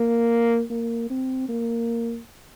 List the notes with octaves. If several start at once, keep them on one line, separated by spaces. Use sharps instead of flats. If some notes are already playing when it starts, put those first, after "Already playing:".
Already playing: A#3
A#3
C4
A#3